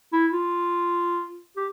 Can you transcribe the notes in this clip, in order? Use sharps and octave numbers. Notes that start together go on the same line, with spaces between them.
E4
F4
G4